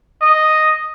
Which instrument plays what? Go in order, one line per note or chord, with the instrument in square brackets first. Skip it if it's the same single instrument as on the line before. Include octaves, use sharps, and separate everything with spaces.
[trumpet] D#5